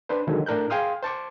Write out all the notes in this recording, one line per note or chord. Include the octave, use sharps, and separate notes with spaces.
D4 B4 C5
D3 D#3 F#3 G#3
A2 D4 A#4 F#6 G6
G#4 F5 G5 C6 D#6 F6
C5 A5 C#6 D6